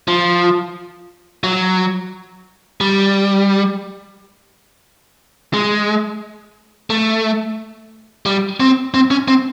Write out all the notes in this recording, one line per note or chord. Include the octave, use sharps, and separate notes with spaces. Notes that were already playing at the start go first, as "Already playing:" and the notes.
F3
F#3
G3
G#3
A3
G3
C4
C4
C#4
C4